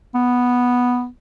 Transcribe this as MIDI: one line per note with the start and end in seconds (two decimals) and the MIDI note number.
0.15 1.07 59